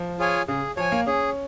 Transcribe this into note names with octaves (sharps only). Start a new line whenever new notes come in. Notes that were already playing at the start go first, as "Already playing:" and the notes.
Already playing: F3
F4 G#4 C#5 G#5
C#3 G#4
F3 C#5 G#5
A#3
C#4 G#4